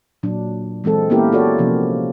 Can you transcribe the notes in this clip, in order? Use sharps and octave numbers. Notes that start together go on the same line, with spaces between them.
A#2 F#3 D4
E3 G#3 C4 A4
A#3 B3 C#4 E4 G4 A#4
F4 F#4 A4 C#5 D5
C3 F3 A#3 C#4